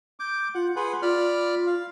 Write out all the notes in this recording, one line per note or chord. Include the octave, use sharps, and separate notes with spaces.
D6 G6
F4 F#5
G#4 B4 F#5 C6
F4 D5 B5 F6
F5